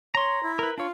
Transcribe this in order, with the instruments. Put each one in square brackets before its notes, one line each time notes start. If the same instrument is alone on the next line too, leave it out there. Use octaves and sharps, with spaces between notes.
[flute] C#5 [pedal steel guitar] A#5 C6
[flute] E4
[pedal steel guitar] A#4 B4
[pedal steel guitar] D4 C#5 [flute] F4